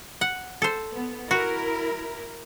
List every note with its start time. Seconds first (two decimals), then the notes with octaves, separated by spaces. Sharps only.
0.21 F#5
0.62 A4 C5
0.93 B3
1.31 E4 F#4 A#4